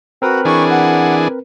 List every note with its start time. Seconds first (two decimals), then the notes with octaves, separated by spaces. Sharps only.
0.22 C4 F#4 A#4 B4
0.45 E3 D4 G#4 C#6
0.70 F#5